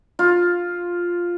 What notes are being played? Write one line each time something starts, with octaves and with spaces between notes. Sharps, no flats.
F4